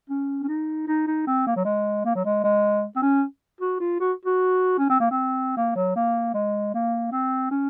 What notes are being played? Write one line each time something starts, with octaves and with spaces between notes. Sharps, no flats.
C#4
C#4
D#4
D#4
D#4
C4
A#3
F#3
G#3
A#3
F#3
G#3
G#3
C4
C#4
F#4
F4
F#4
F#4
C#4
C4
A#3
C4
A#3
F#3
A#3
G#3
A#3
C4
C#4